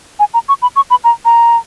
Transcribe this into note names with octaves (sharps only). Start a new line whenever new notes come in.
G#5
A#5
C#6
B5
C#6
B5
A#5
A#5